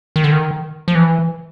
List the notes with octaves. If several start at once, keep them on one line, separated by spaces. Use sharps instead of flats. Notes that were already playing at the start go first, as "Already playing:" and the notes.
D#3
D3
D#3
F3
E3